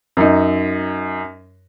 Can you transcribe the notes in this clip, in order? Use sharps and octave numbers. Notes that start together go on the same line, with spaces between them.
F#2 D#4